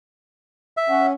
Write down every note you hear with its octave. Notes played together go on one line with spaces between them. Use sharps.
E5
C#4 F#5